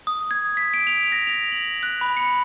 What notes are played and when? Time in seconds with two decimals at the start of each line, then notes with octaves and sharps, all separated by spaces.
0.07 D#6
0.31 G#6
0.57 B6
0.74 D7
0.87 F7
1.12 A#6
1.27 F7
1.52 F#7
1.83 F#6
2.01 B5
2.17 C#7